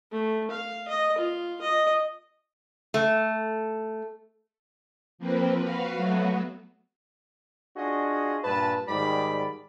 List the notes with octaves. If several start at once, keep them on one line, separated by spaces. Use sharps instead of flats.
A3
F5
D#5
F4
D#5
A3
F3 A#3 C4 B4
F#4 B4 F5
F#3 A3 B3 F#4
D4 F4 F#4 G#4 D#5
G2 A#2 B4 A5
G#2 D#3 G3 D5 B5